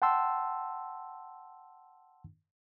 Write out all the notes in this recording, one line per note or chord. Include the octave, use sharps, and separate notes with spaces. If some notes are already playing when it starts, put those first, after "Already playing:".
F#5 G5 A5 C6 E6